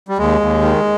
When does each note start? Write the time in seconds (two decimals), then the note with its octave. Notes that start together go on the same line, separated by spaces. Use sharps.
0.08 G3
0.18 D#2 G#3
0.41 D#2
0.62 D#3